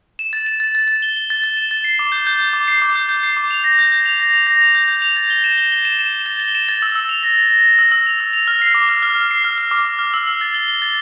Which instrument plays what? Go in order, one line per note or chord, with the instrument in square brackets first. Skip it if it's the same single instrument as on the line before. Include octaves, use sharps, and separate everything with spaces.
[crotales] E7
A6
E7
A6
A6
A6
G7
G7
A6
A6
E7
A6
C7
D6
G6
G6
D6
D6
C7
D6
G6
G6
C7
D6
F7
A#6
G6
G6
F7
A#6
F7
A#6
F7
G6
G6
F7
A6
G7
E7
G7
G7
E7
E7
E7
A6
G7
E7
A6
E6
E6
F7
A#6
A#6
A#6
A#6
E6
E6
F7
E6
F7
F6
C7
D6
F6
F6
D6
C7
F6
F6
D6
D6
F6
E6
E6
A6
G7
G7
A6